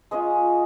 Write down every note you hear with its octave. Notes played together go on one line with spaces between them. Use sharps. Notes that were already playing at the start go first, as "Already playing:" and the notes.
G#3 C#4 F4 D#5